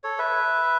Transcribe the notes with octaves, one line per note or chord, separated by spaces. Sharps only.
A4 C#5
B4 E5